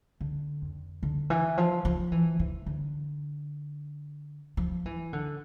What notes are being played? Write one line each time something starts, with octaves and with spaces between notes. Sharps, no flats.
D3
F2
D3
E3
F3
F3
E3
E3
D3
F3
E3
D3